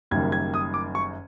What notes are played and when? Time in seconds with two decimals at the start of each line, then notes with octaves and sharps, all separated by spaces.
0.11 F#1 F#2 D#3 G3 G#6
0.32 G#6
0.54 D#6
0.74 D6
0.95 C#6